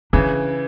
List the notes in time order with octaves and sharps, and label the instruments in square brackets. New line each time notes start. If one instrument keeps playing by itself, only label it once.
[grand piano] C#3 E3 [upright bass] D4